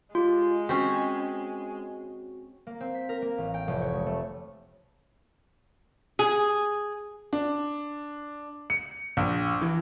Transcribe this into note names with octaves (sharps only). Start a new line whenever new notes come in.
G#3 F4 G4
C4 C#4 F#4
A#3
C4
B6
A#4
A#3
A1
G5
F1
C#5
G#3
A3
G#4
D4
C#7
A#1
E3